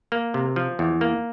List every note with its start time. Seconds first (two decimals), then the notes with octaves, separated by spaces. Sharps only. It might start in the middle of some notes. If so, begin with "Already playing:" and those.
0.12 A#3
0.34 C3
0.56 F3
0.79 E2
1.01 A#3